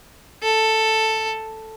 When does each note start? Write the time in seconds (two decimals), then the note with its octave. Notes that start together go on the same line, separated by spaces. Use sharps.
0.42 A4